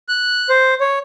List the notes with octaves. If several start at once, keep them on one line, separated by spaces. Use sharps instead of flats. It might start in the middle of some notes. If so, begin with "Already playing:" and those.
F#6
C5
C#5